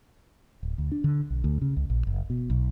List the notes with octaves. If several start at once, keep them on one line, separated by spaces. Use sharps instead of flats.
D1
D2
D4
D3
B1
D2
C#3
C#2
A#1
F#1
B2
B1